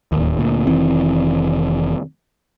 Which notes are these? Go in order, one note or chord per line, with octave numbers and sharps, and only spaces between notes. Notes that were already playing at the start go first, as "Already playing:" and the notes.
D1 D#2
D2 A#2
F1 D#3 E3 C4